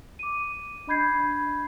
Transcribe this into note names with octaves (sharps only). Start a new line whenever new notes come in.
D6 D#7
D4 D#5 B5 G6 G#6 C7